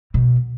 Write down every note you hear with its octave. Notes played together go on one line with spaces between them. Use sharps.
B2